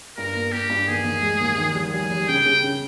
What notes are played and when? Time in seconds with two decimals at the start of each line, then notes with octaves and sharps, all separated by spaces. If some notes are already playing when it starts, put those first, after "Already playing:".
0.17 G2 A#4
0.35 A#3
0.52 A#3 G4
0.70 G2
0.88 D#2 G#4
1.04 D#2
1.23 G#3
1.40 D#2
1.58 D#3
1.75 G3
1.93 G3 G#4
2.11 G3
2.28 C#3 G5
2.46 C#3
2.63 C#3